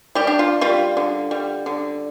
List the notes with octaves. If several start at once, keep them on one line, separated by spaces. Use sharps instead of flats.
G3 G4
D4
F4
G3 F4
D3
G3
D3